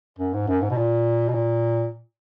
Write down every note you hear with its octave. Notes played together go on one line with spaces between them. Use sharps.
F#2
G#2
F#2
G#2
B2
A#2
B2
A#2